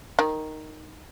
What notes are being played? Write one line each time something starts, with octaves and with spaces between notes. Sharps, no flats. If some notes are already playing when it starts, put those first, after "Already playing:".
D#3